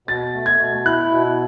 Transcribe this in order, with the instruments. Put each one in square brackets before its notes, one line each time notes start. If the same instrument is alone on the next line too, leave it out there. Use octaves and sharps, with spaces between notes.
[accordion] B2 [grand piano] A6
[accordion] A3
[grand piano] G#6
[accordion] B2
[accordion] E4 [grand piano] F#6
[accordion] B2